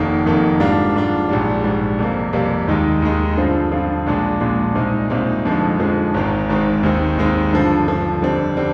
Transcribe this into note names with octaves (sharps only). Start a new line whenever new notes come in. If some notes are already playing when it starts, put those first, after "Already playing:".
Already playing: F1 F2 D#3 A#3
F1 F2 D#3 A#3
G#2 G3 D4 F4
G#2 G3 D4 F4
A#1 G#2 G3
A#1 G#2 G3
F2 C3 G3 A#3
F2 C3 G3 A#3
D#2 D#3 G#3 D#4
D#2 D#3 G#3 D#4
G2 D3 F3 C4 F4
G2 D3 F3 C4 F4
A#1 A#2 G#3 D4
A#1 A#2 G#3 D4
C2 A#2 G#3 C4 D#4
C2 A#2 G#3 C4 D#4
F2 D3 F3 G#3 D#4
F2 D3 F3 G#3 D#4
G#1 G#2 D#3 G#3 C4
G#1 G#2 D#3 G#3 C4
D#2 D#3 G#3 C4 D#4
D#2 D#3 G#3 C4 D#4
G2 D3 F3
G2 D3 F3
F2 D3 G3 C4
D3 G3 C4